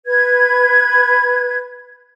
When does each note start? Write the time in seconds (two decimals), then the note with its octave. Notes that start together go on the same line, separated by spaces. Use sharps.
0.06 B4 G#6